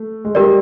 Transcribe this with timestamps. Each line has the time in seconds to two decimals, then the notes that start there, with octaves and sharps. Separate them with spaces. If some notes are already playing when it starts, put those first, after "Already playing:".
Already playing: A3
0.25 G#3
0.35 G3 G4 A#4 D5